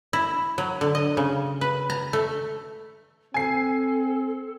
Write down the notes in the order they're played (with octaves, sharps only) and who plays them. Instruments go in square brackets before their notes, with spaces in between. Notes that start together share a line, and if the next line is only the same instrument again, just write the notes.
[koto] E4
F#3
D3
D#5
C#3
B4
A#5
A3
[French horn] C4 [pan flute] A4 [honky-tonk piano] G#5 C7